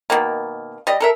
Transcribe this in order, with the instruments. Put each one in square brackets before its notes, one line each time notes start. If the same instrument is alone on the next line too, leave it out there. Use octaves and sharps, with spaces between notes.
[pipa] B2 D#3 A#3
G3 D#5
A4 A#4 E5